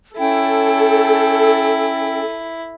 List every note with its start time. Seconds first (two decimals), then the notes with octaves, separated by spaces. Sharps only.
0.18 C#4 E4 A4 G5